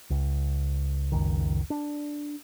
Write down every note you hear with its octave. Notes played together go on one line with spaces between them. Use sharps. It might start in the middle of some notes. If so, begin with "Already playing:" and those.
C#2
F#1 C#2 D#3
D4